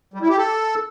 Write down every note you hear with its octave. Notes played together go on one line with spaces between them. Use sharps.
G3
E4
G4
A4